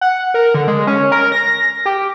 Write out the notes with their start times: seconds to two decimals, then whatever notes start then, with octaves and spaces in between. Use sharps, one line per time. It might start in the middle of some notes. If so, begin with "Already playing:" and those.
0.01 F#5
0.34 A#4
0.55 D3
0.68 G#3
0.87 C#4
1.12 A#4
1.32 A#6
1.86 G4